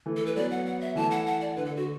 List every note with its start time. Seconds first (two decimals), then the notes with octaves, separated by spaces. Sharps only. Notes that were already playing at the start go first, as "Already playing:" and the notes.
0.06 E3 A3
0.16 A4
0.26 B4
0.36 F#3 B3 D5
0.51 F#5
0.66 F#5
0.81 E5
0.96 E3 A3 A5
1.11 F#5
1.26 F#5
1.41 D5
1.56 D3 B4
1.65 A4
1.71 D3
1.77 F#4